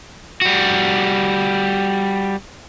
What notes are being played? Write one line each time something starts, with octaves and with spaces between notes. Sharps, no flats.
G3 F#4